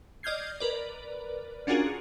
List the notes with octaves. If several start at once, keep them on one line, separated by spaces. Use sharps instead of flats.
D5 D#5 F6 G6 G#6 C7
A#4 B4 D5
C#4 D4 F4 F#4 G#4 A#4